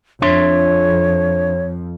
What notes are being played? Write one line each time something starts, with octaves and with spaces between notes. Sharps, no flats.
F2 D4 C#5 E5 C6